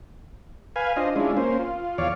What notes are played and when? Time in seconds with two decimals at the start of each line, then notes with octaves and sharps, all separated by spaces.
0.76 B4 F5 G#5
0.96 D4 F4 C5 D#5
1.16 G#3 C#4 D4 E4 F4
1.37 A#3 C#4 C5
1.59 F4
1.98 E2 C#5 D5 F5